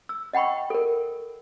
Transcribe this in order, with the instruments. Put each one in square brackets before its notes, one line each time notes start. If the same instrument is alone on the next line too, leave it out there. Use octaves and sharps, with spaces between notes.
[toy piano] E6
D#5 F#5 G5 B5 C#6
A4 A#4